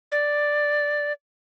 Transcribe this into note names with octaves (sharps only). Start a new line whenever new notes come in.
D5